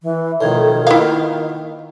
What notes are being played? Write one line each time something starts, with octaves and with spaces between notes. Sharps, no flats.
E3
B1 F2 A2 D#3
A#3 B3 E4 F4 F5